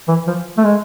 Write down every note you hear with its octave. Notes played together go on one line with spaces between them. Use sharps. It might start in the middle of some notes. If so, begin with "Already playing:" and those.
E3
F3
A3
G#3